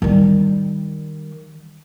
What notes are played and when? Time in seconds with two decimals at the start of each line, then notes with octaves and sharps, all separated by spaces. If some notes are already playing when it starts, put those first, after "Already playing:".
0.02 D#3 G3